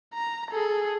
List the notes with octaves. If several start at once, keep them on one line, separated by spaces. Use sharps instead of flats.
A#5
G#4 A4